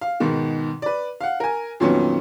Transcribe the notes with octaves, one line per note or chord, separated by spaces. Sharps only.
F5
G#2 B2 D#3
B4 D5
F5 F#5
A#4 G#5
F2 A#2 D#3 F#3 B3 C#4